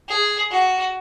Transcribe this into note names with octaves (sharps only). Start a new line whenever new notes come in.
G#4
F#4